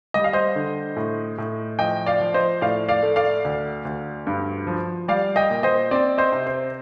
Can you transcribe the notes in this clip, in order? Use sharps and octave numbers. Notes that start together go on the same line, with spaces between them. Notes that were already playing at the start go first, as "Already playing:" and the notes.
G3 D#5
F5
C5 D#5
D3
A2
A2
F3 D#5 G5
D5 F5
F3
C5 D#5
A2 D5 F5
D5 F5
A3
D5 F5
D2
D2
G2
F3
G3 D5 F5
D#5 G5
A#2
C5 D#5
C4 D5
C5 D#5
C3
C5